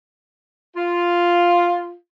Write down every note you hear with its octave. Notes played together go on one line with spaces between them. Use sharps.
F4